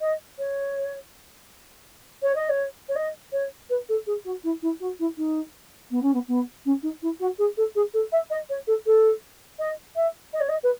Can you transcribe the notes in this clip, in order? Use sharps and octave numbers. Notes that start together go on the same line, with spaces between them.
D#5
C#5
C#5
D#5
C#5
C#5
D#5
C#5
B4
A4
G#4
F#4
E4
E4
F#4
E4
D#4
B3
C#4
B3
B3
C#4
D#4
E4
F#4
G#4
A4
G#4
A4
E5
D#5
C#5
A4
A4
D#5
E5
D#5
C#5
D#5
B4